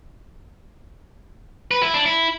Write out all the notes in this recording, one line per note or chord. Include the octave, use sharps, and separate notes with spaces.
B4
E4
D4
E4